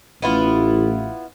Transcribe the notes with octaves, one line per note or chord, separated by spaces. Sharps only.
A1 B3 E4 F4